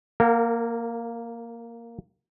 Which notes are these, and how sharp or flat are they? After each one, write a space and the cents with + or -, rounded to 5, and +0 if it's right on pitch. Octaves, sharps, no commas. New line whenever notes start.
A#3 -5 A#4 -35 F#5 +25